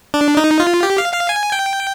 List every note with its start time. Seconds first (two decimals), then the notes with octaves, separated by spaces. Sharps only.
0.14 D4
0.37 D#4
0.60 F4
0.83 G4
0.98 F5
1.13 F5
1.29 G#5
1.52 G5